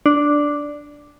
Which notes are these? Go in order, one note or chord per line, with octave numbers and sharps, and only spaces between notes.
D4